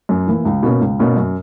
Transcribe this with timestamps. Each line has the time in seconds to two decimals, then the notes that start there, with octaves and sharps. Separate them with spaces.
0.09 F#2
0.27 E3 A#3 E4
0.45 C#2
0.63 B2 A#3 C#4
0.81 C#2
0.99 B2 A#3 C#4
1.16 F#2